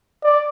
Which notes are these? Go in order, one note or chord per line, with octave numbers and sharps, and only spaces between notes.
D5